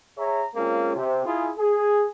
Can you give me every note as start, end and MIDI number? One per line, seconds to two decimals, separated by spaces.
0.18 0.44 68
0.18 0.44 73
0.18 0.44 76
0.18 0.44 82
0.56 0.96 56
0.56 0.96 58
0.56 0.96 60
0.56 0.96 61
0.56 0.96 65
0.96 1.23 48
1.26 1.51 64
1.26 1.51 65
1.26 1.51 68
1.58 2.05 68